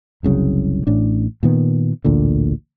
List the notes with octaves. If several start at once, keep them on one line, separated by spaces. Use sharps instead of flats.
F#1 C2 C#3 F#3
A1 A2 D4
A#2 D#3 B3
A1 D2 A#2 D3